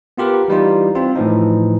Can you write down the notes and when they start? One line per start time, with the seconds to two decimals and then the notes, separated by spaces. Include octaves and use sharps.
0.18 B3 F4 G4 A#4 B4
0.48 E3 G3 D#4 F4
0.95 C4 F4
1.15 A2 E3 F3 D#4